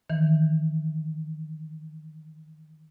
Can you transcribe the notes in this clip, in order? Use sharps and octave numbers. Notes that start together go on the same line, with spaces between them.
D#3 E3